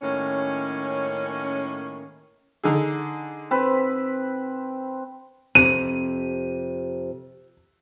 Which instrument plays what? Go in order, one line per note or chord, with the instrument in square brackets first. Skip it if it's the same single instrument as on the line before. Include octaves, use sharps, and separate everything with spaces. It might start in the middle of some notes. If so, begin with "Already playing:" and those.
[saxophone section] A2 D#3 A#3 C#4
[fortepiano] D3 D#4 G#4
[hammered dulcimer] C4 B4 B5
[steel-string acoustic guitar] F2 C3 [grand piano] D#7